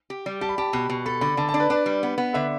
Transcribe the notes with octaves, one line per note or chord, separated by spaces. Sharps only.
G4
G3
G4 A5
B5
G4 A5
B2 B5
B2
A4 B5
D3 B5
D3 A5
A5
D4
B4
D4 B4
G3
B3
B3
D3 E5